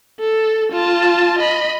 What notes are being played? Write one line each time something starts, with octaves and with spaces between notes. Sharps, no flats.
A4
F4 A5
D#5 B5